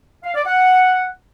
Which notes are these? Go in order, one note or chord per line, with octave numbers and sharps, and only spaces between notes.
F5
D5
F#5